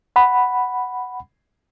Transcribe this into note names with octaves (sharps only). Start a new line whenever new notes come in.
F#5 B5